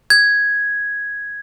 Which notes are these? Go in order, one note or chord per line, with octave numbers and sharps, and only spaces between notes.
G#6